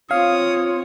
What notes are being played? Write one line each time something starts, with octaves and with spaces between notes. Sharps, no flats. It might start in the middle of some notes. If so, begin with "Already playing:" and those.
C4 F4 C#5 F5 D#6